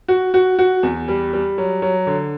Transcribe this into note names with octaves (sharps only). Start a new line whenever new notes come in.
F#4
F#4
F#4
E2
G3
G3
F#3
F#3
D3